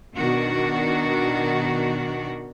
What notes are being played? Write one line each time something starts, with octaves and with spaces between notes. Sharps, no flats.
B2 D#3 D4 F#4